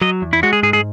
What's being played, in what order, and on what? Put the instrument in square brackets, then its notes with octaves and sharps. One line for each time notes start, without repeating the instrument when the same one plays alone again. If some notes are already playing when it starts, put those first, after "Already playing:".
[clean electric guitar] F#3 [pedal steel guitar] D#5
[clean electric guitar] E2
[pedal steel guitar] E4
[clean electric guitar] G#3 [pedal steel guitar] F#4
[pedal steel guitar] G#4
[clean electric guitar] G#2 [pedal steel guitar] G#4
[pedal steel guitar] G#4